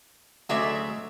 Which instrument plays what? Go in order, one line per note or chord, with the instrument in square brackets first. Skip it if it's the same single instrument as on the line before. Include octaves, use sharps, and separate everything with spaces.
[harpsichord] D2 D5 [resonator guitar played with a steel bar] F#3 G#3 E5